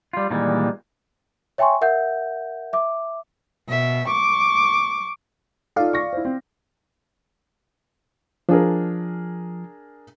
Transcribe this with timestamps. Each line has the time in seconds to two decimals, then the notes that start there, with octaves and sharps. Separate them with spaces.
0.13 G3 F4
0.30 A#2 D#3 E3 G3 G#3
1.58 C#5 E5 G5 G#5 C6 C#6
1.81 A#4 E5 F#5 G6
2.73 E5 D6
3.68 B2 E5
4.07 C#6 D6
5.76 D#4 F4 A4 D5 F5
5.93 C#6 A#6
6.13 E4 C5
6.25 C4
8.49 F3 D4 G#4 A#4